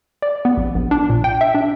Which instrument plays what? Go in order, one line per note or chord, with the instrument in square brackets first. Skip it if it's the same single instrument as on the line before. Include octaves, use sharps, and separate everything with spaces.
[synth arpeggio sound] D5
B3
A#1
A#1
D4
A#2
G5
E5
D4